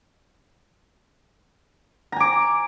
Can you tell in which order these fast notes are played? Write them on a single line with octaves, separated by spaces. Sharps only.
A#5 G#5 D6